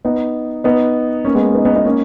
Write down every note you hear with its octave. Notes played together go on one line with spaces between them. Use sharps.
B3 D#4
B3 D#4
A#3 C#4
G#3 B3
B3 D#4
B3 D#4
B3 D#4
A#3 C#4